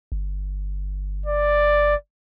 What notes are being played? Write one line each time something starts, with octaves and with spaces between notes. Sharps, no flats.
G1
D5